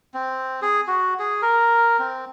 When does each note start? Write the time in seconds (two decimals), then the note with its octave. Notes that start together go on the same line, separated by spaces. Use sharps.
0.14 C4
0.62 G#4
0.88 F#4
1.19 G#4
1.42 A#4
1.99 C4